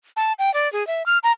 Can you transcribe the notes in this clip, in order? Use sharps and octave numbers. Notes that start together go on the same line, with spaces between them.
A5
G5
D5
G#4
E5
F6
A#5